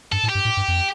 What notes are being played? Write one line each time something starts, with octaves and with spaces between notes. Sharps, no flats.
G2 A4
A2
G4
G2
A2
G2
F2